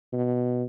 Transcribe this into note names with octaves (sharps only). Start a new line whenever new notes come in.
B2